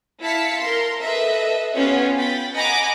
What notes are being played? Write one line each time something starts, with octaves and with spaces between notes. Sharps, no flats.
E4 F5 A5 B6 C#7
A#4 C6
A4 B4 D#5 E5
B3 C#4 F4 G4 C#5
G5 B5 A6 B6
D#5 F#5 G#5 A#5 B5 D6